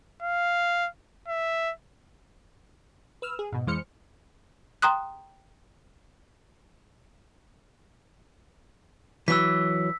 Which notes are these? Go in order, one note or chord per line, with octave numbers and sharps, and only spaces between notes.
F5
E5
B4 E6 F6
G#4
G#2 B2
F2 E3 G#3 C5 F6 C#7
G5 A#5 C6 D#6 F#6
E3 F#3 E6 B6